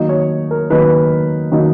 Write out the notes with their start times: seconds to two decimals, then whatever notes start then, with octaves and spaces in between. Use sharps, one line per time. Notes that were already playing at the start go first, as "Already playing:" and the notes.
Already playing: D#3 F#3 A#3 D#4
0.09 C#5
0.51 A#4
0.70 D#3 F#3 A#3 D#4 B4
1.52 D#3 F#3 A#3 D#4